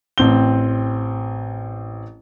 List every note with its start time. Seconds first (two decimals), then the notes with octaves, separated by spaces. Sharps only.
0.18 A1 C4 G7